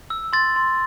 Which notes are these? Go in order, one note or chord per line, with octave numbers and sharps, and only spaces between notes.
E6
C6 A6
C6